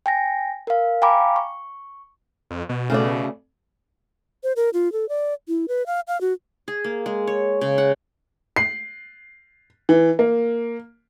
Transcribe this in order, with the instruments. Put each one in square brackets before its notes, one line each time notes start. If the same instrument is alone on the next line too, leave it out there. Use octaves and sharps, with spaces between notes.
[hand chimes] G5 G#5 A#6
A#4 F5
F5 G5 G#5 A#5 B5 D6
C#6
[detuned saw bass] F2
B2
[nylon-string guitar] C#3 A3 D5
[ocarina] C5
A#4
F4
A4
D5
E4
B4
F5
F5
F#4
[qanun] G#4
A#3
G#3
C#5
C#3
F#5
[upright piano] C7
E3
A#3